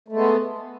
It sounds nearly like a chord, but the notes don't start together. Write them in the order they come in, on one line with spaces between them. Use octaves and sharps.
A3 G#3 B3